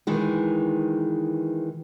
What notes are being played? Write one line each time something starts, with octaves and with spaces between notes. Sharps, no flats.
D#3 E3 G#3